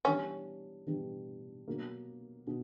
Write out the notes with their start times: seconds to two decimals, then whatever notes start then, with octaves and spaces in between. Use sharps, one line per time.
0.05 E3 G3 B3 C#4 D4 G4
0.87 E3 G3 B3 D4 G4
1.68 B2 F#3 A#3
2.47 B2